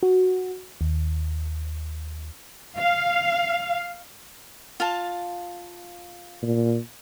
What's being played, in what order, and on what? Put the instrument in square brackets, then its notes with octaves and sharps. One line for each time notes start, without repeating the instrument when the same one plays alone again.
[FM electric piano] F#4
D#2
[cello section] F5
[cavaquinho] F4 F5 A5
[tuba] A#2